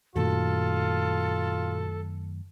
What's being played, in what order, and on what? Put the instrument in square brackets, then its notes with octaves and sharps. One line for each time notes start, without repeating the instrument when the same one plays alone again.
[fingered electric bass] F#2 D#3 A3 [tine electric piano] A#2 F#4 [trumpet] F4 [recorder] A4